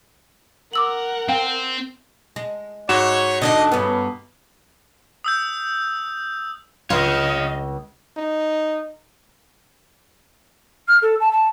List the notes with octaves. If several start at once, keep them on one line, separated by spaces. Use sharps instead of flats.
A#4 F#5 D6 E6 F#7
C4 F5 G5
G#3
G#2 F#4 C#5 E7
D3 D4 D#4 D#5
G2 B3 C#4
D#6 E6 G6
C#2 F4 C#5 D#5 F5 D#6
D#4
F6
A4
A5
A5